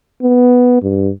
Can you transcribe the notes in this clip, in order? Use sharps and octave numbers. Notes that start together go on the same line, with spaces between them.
B3
G2